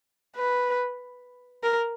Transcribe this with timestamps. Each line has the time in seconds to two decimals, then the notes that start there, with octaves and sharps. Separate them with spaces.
0.36 B4
1.63 A#4